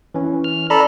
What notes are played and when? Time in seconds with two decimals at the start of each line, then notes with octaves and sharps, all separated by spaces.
0.14 E3 C#4
0.44 F6
0.70 A4 D5 A#5 B5